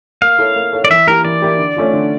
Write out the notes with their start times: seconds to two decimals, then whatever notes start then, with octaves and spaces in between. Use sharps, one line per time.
0.22 A#3 F5
0.38 E4 A4 C#5
0.56 A#3
0.73 E4 A4 C#5
0.85 D5
0.90 E3 E5
1.07 A#3 E4 G4 A#4
1.25 E3 D5
1.42 A#3 E4 G4
1.58 D3
1.76 A3 C#4 F4
1.93 D3